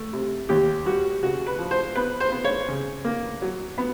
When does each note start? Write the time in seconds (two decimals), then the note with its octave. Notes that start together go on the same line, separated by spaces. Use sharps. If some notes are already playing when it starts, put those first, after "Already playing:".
Already playing: A3
0.13 C3
0.49 D#2 G4
0.85 G3 F#4
1.23 C#3 F#4
1.46 B4
1.59 F3
1.71 C5
1.95 B3 B4
2.20 C5
2.32 B3
2.44 C#5
2.68 C#3
3.05 A#3
3.42 F#3
3.78 B3